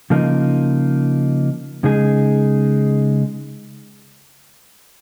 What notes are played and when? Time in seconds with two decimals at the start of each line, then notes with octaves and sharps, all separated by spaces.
0.10 C#3 F3 A#3 D#4
1.84 C#3 G#3 D#4 G#4